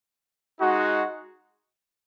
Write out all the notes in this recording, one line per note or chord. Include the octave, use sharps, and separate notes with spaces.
G#3 D#4 F#4